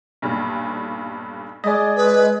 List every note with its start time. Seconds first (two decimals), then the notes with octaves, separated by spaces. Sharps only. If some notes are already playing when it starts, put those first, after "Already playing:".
0.22 B1 G2 A#2
1.64 G#3 D5 D#5
1.97 B4